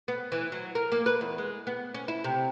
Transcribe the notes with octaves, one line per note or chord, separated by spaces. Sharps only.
B3
E3
F#3
A#4
A#3
B4
E2
G#3
B3
C#4
E4
C3